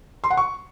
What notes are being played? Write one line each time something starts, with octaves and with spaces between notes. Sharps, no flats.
C6
F#5
C#6